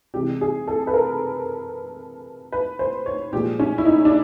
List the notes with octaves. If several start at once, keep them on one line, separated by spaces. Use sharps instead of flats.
C3 E3 G#3 G4
G#4
A4
B4
A#4
B4
C5
C#5
A#2 F3 G#3 G4
C#4
E4
D#4
D4